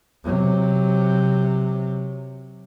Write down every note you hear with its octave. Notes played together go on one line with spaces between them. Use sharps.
C3 F#3